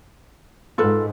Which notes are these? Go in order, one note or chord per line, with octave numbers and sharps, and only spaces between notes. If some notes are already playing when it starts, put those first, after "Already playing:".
G#2 F4 A4 B4